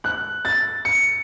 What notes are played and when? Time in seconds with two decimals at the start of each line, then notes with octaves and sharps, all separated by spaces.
0.04 F#6
0.45 A6
0.85 C#7